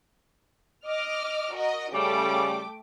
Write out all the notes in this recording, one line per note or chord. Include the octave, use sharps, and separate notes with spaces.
D#5 D6 F6
F#4 A#4 D#5
C#3 G3 A3 G5 D6